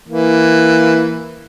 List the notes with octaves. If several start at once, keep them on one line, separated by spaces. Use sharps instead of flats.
E3 A#3